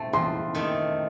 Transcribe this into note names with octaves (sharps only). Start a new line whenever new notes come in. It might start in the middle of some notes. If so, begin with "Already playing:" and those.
Already playing: A3 C4 A5
E2 C6
D#3 A3 C4